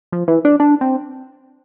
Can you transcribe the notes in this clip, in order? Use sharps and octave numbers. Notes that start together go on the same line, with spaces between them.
F3
E3
D4
D4
C4